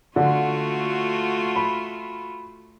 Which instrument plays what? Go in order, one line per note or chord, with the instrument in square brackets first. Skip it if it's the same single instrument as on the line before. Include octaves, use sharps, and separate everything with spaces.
[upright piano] D3 [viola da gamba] A3 F4 F#4
[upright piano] B5